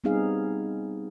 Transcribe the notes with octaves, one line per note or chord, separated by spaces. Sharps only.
G3 B3 C4 D#4 G#4 F5